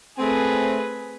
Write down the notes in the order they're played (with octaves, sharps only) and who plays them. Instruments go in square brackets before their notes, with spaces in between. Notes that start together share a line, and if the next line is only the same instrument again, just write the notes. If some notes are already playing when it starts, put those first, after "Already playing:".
[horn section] A3 C4 [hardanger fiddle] G#4 B4